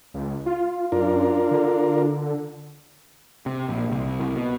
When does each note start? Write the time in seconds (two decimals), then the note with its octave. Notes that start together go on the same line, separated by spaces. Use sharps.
0.14 C#2
0.46 F4
0.92 F#2 D4 F4 A#4
1.51 D3
3.46 C3
3.69 A#1
3.92 C2
4.20 C2
4.36 B2